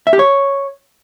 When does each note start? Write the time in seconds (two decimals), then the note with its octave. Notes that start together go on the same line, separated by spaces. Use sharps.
0.07 E5
0.13 G4
0.19 C#5